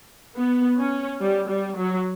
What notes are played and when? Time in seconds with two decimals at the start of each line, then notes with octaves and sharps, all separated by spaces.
0.35 B3
0.78 C#4
1.20 G3
1.48 G3
1.76 F#3